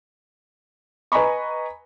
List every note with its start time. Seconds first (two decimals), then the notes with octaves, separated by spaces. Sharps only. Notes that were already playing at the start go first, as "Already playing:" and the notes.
1.12 B4 D#5 G#5 A#5 B5 C#6